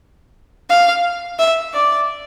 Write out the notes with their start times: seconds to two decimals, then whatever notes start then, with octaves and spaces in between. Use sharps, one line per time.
0.70 F5
1.39 E5
1.74 D5